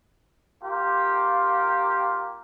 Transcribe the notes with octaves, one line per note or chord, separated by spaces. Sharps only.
A#3 F4 G4